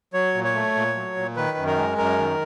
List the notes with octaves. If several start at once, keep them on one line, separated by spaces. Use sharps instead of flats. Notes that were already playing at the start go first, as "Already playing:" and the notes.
F#3 C#5
A#2
C#5
A3
A#2
F#3
A#2
D#3 B4
F#2
A#4
G#3
F#2 A#4
D#3